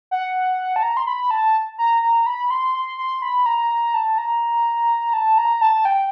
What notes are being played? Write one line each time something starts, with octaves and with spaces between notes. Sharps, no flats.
F#5
A5
A#5
C6
B5
A5
A#5
A#5
B5
C6
C6
C6
B5
A#5
A#5
A5
A#5
A5
A#5
A5
G5